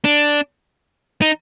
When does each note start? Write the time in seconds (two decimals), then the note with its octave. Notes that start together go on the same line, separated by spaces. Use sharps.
0.05 D4
1.22 D#4